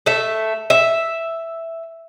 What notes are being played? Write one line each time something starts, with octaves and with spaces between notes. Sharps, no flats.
A3 E5
E5